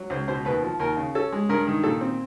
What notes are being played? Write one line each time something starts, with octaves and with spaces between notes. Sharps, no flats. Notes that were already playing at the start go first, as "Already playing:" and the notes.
Already playing: F#3
C#2 C5
B2 C5
D#2 B4
F3
D#2 A#4
C#3
C#4 A4
G#3
G2 A#4
D#3
A#2 A4
C4